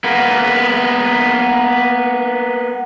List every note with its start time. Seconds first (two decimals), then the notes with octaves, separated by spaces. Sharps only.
0.04 A#3 B3